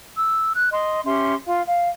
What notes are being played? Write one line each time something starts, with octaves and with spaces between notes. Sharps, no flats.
E6
F#6
D#5 C6
C#4 G4 E5 C6
F4 F5
F5